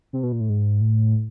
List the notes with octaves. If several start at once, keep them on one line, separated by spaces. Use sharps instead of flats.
C3
B2
A#2
A2
G#2
A2